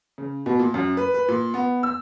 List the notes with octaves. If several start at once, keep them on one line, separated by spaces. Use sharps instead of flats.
C#3
B2
A#2
F#2
B4
B4
A#2
B3
E6